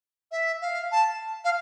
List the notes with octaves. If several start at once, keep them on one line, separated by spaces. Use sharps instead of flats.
E5
F5
A5
F5